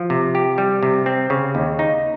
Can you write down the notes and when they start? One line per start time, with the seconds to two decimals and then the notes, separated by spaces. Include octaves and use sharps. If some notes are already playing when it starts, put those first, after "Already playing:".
Already playing: F3
0.10 C3
0.35 G4
0.58 G3
0.83 C3
1.06 C4
1.30 C#3
1.55 D#2
1.79 D#4